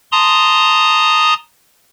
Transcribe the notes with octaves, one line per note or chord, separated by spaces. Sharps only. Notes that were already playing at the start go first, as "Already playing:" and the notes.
A5 A#5 C6 D#6